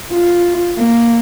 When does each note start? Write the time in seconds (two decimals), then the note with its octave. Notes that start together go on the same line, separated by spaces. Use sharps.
0.11 F4
0.78 A#3